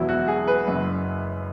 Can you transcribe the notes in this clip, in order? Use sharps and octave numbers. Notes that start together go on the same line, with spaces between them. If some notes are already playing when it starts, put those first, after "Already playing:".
Already playing: E1 E2 B2 F#3 E4
F#4
G#4
B4
F#1 F#2 C#3